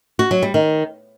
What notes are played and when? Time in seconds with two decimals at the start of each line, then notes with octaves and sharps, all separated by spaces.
0.19 F#4
0.31 F#3
0.42 G3
0.54 D#3